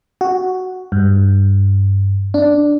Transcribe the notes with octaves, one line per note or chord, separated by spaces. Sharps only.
F#4
G2
D4